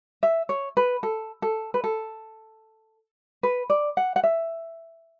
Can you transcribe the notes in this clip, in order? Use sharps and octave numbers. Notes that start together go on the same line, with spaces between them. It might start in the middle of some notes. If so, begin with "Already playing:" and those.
E5
C#5
B4
A4
A4
B4
A4
B4
D5
F#5
F#5
E5